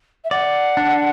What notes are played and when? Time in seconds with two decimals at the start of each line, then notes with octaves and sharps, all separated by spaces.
0.24 E5
0.31 D5 F#5
0.77 D4